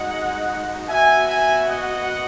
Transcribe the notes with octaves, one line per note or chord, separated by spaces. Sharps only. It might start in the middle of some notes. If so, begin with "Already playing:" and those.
Already playing: G#3 D#4 F#4 D#5 F#5
B3 F#4 E5 G#5
E5 G#5
D#5 F#5